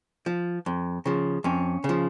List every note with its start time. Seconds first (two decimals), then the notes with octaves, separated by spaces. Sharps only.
0.26 F3
0.66 F2
1.06 C#3 F3
1.44 F2 C#4
1.84 C#3
1.89 F3